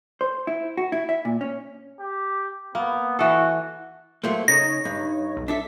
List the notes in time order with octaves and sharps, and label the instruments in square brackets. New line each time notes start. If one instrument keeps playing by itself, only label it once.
[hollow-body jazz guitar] C5
E4
F#4
E4
E5
A#2
C#4
[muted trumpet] G4
[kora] A#3 [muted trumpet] B3
[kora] E3 A4 [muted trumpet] F#4
[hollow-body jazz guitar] F#3 A3 A#3 [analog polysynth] C5
[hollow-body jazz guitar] C#3 [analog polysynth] D#4 C#5 [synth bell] A#6
[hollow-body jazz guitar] G2
[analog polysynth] B1
[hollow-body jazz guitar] D4 A4 E5 [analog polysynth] B6